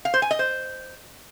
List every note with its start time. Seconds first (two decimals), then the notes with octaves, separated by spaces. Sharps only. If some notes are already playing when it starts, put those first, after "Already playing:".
0.05 F5
0.14 C5
0.22 G#5
0.31 D#5
0.39 C5